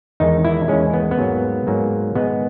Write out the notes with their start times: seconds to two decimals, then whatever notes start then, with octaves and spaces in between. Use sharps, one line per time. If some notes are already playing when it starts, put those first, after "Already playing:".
0.20 E2 D#3 G#3 D#4
0.45 E4
0.68 E2 D#3 G#3 C#4
0.94 B3
1.11 B3
1.18 G#2 F#3 A#3
1.67 G#2 F#3 A#3
2.15 G#2 D#3 G#3 B3